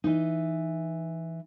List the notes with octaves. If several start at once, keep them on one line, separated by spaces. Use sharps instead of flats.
E3 D#4